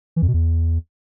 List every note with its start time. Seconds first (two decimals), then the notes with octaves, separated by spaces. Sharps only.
0.16 E3
0.22 F2
0.28 B2
0.34 E2